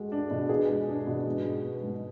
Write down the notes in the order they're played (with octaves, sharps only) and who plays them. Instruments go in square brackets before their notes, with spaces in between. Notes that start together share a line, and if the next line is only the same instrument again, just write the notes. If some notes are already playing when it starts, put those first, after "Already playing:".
Already playing: [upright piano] G#3 F#4
D4
B2
G#4
G#3
D4
B2
G#2
G#3
B3
G#2